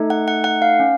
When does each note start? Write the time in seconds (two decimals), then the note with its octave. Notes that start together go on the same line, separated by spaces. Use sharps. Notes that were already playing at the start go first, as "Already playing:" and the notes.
Already playing: A3 D#4 A4
0.10 F#5
0.28 F#5
0.44 F#5
0.62 F5
0.80 C#4